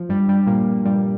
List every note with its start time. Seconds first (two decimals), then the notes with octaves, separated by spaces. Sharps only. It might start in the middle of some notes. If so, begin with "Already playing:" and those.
Already playing: F3
0.09 G2 G3
0.28 G2 G3
0.47 A#2 A#3
0.85 G2 G3